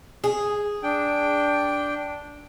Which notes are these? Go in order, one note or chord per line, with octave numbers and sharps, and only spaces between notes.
G#4
D4 G5